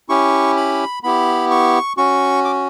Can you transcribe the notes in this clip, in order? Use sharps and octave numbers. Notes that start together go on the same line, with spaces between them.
C#4 E4 G4 C#6
B5
B3 E4 G4 B5
C#6
C#4 F#4 C#6
D6